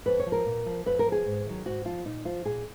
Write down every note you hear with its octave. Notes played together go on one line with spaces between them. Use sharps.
F2 B4
C#5
F3
A#4
A#2
F3
F2 B4
A#4
F3
G#4
G#2
D#3 F#3
G#2 F#4
F3 F4
A#2 D#4
F3 F4
A#2 G#4